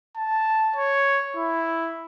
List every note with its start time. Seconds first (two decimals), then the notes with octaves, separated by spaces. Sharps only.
0.17 A5
0.76 C#5
1.36 E4